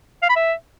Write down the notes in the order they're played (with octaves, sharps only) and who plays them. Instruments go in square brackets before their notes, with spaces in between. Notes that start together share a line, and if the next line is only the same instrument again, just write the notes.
[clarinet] F5
B5
E5